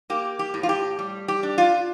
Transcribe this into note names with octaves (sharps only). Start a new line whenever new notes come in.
A#3 G4
G4
A2
F4
G4
G3
G4
D4
F4